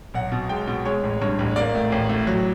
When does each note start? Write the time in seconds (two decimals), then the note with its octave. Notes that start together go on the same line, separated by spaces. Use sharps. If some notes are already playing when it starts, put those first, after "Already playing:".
0.14 B1 F#5
0.32 B2
0.49 G#3 G5
0.67 B2
0.85 G#3 C#5
1.03 A1
1.21 G2 C#5
1.39 A1
1.56 A#3 D5
1.75 A2
1.92 A1
2.09 A2
2.27 F#3